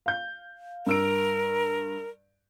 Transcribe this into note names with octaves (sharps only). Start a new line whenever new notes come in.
F5 G6
G2 A#4 E6 D7